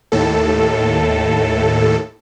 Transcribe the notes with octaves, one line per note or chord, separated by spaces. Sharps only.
D#2 A2 A4